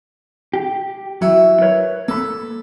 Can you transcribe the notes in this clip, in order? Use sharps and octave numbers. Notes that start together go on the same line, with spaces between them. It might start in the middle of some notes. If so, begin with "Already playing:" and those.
G4
F#3 E4
A#4 B4 C#5
A#3 A4 B5